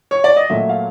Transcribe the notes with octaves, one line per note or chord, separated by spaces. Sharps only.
C#5
D5
D#5
A#2 F#3 A3 E5
F5